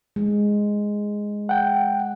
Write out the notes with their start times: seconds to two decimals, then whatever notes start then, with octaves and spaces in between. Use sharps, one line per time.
0.16 G#3
1.49 F#5 G5